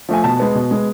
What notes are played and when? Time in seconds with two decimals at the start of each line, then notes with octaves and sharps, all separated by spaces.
0.09 F3 A3 G#5
0.24 B2 A5
0.40 G#3 B3
0.55 B2
0.71 G#3 B3